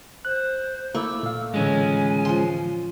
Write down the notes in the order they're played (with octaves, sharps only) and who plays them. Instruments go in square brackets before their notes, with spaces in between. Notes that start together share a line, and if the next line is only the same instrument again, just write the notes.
[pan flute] C5 [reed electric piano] F#6
[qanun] A3 C#6 [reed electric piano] A#3 E4 D6 [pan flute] E6
[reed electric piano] A#2 F5
[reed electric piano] A2 D3 E3 [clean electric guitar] G#3 C#4 [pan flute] G#5
[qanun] F3 C6